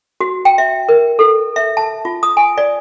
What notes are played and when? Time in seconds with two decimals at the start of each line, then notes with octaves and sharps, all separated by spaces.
0.20 F#4
0.45 G5
0.58 E5
0.89 A#4
1.19 A4
1.56 E5
1.77 A5
2.05 F4
2.23 D#6
2.37 G#5
2.58 D5